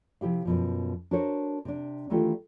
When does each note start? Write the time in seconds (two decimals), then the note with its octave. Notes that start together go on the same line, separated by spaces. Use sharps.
0.21 C3 F3 E4 G4 F5
0.45 F#2 B2 F3
1.11 D4 F#4 A#4 C5 C#5
1.65 C3 D4
2.10 D#3 E3 A3 D4 F4 G4